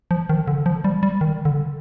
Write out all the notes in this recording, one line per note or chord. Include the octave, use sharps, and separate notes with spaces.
F3
D#3
D3
F3
G3
G3
D#3
D3